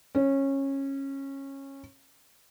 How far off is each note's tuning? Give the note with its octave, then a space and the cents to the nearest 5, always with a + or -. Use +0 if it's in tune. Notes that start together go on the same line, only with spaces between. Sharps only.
C#4 -20